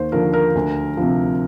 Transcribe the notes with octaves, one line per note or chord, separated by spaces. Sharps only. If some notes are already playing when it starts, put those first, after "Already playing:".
Already playing: D#2 C5
D3 F3 A#4
A#4
D2
C3 F3